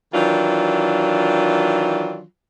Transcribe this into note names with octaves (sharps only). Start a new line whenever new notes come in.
D#3 E3 F#3 D4 F4